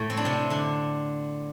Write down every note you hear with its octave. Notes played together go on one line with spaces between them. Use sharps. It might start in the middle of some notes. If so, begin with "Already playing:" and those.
Already playing: A2 A3
C4
D4
C3 C4
D3 D4